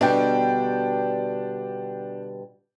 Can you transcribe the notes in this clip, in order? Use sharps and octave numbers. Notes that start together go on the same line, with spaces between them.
B2 D3 G3 D4 G5